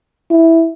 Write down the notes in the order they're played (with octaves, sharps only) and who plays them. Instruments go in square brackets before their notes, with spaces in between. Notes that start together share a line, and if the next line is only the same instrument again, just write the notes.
[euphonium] E4